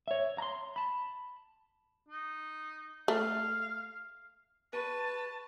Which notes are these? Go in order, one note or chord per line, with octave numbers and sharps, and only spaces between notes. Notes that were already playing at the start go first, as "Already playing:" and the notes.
C#5 E5
A#5 C6
A5 B5
D#4
A3 F5
B4 A5 B5 C#6 D#7